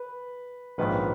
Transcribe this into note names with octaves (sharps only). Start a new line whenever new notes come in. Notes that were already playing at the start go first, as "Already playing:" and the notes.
Already playing: B4
A#1 G#2 D#3 A#3 C#4 B4